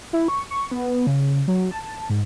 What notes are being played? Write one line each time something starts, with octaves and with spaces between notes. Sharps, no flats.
E4
C#6
C#6
B3
C#3
F#3
A5
G#2